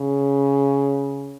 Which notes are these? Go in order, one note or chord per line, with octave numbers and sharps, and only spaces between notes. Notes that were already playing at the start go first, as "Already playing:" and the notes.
Already playing: C#3